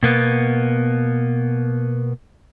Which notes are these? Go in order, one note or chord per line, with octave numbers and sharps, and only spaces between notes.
B2 A#3 B3